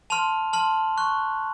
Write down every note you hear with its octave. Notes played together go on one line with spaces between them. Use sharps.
A5 C6 F6 F7
A5 C6 F6 F#7
C#6 F#6